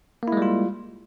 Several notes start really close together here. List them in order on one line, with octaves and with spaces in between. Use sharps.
A#3 E4 G#3 G3 F4